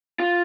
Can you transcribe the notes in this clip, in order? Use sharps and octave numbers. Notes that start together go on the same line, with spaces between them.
F4